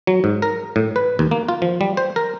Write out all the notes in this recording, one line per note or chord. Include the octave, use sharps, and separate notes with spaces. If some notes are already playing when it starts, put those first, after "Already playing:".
F#3
G#2
A#4
A2
B4
D#2
A#3
F4
F3
G3
C5
A#4